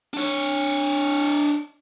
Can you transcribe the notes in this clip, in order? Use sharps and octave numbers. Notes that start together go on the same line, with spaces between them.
D4 C#5